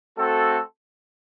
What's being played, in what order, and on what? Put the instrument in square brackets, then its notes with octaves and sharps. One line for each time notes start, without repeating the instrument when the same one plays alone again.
[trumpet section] A3 C4 F#4 A4